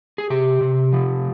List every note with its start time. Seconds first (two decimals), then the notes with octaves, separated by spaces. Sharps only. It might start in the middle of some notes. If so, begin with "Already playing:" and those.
0.18 G#4
0.30 C3 G4
0.61 C3
0.93 F3